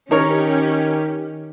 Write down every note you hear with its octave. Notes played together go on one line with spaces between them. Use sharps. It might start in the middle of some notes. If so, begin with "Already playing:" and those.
D#3 C#4 D#4 G4 A#4 C#5